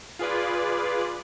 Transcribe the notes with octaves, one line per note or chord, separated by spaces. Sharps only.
F4 G#4 B4 D5